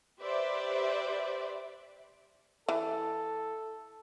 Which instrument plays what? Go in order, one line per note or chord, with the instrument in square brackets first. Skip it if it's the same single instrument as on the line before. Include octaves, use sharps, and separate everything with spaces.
[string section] G4 B4 C5 D5 E5
[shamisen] E3 [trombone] A4